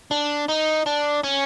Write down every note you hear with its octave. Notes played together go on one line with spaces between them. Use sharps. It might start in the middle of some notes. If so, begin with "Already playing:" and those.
D4
D#4
D4
C#4